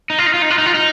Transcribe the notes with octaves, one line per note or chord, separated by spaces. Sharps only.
D#4
F4
D#4
F4
D#4
F4
D#4
F4
D#4